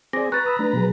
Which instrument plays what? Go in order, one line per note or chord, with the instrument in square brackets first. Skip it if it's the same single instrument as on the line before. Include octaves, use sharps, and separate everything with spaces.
[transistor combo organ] C4 G#4 [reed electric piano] D5 D6 [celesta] A#6
[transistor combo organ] B4 A#5 [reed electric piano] C#6 [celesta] F#6 A6
[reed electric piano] B5 D#6 E6
A3 D4
B2 F#3 G#4